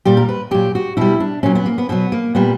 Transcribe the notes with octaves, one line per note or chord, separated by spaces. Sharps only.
A#2 G3 G4
A#4
B4
A#2 F#3 G4
F#4
B2 G3 E4
D4
A#2 F#3 C#4
B3
A#3
B3
B2 F#3 B3
A#3
A#2 G3 B3